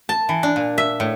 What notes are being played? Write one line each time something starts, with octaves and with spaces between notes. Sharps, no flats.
A5
E3
D4
A#2
E5
A2